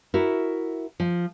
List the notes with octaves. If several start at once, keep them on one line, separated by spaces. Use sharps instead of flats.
E4 F#4 A#4
F3